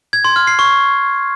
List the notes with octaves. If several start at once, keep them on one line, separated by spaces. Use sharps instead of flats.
G#6
C6
F6
C7
C#6